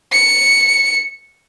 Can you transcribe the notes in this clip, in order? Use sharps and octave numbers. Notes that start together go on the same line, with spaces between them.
C#7